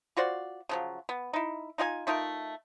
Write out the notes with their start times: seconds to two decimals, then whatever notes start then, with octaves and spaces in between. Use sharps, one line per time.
0.17 F4 F#4 C5 D5
0.69 C#3 F3 F#3
1.09 B3
1.33 D#4 E4
1.78 D#4 F4 D5 G#5
2.07 A3 D#4 F4 A#4